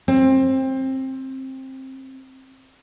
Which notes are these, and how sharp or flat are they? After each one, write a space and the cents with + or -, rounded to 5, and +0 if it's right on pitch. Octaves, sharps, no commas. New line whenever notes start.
C4 +20